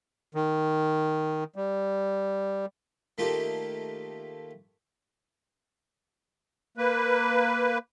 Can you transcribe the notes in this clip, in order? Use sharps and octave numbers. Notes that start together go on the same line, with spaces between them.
D#3
G3
D#3 A3 A#3 F4 G4
A#3 B4